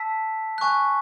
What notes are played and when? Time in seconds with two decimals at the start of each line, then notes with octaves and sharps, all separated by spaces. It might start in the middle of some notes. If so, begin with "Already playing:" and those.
Already playing: A5 E6 B6
0.58 G#5 C#6 F#6